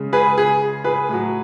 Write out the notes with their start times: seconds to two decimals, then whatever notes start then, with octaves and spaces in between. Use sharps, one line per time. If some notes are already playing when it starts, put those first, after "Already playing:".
Already playing: C#3 G#3
0.13 G#4 B4
0.38 G#4
0.84 G#4 B4
1.09 A2 F#3